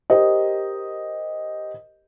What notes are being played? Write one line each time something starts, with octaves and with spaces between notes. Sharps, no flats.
G4 A#4 C5 D#5